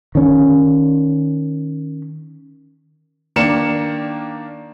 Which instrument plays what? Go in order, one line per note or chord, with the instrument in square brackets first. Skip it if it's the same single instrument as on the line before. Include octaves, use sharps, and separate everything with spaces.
[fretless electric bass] D#3 C#4
[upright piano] D#3 A#3 D4 C#7 E7